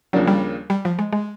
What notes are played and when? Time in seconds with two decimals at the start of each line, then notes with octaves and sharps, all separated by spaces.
0.13 D#2 C#3 F3 F#3 A#3 D4
0.27 G3
0.70 G3
0.85 F3
0.99 G#3
1.13 G#3